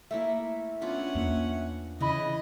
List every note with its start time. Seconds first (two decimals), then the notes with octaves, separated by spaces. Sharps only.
0.11 A3 A#3 E4 E5
0.82 B3 C#4 D4 F4 F#5
1.15 E2 A#3
2.01 C#3 E3 E4 D#5 B5